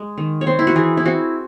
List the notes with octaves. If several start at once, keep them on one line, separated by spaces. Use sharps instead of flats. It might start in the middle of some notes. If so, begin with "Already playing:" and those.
Already playing: G#3
D#3
C#5
C4 C5
E4
F#4
E3 G#4
E4
C4 F#4